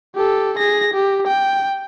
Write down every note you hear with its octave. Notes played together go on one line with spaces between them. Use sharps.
G4 A4
G#4 A#6
G4
G5